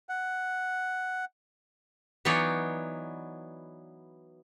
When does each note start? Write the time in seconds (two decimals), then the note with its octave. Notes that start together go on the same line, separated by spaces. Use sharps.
0.09 F#5
2.25 E3 F#3 B3 D#4 C#5 D5